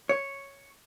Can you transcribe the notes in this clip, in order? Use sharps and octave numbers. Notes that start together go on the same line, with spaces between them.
C#5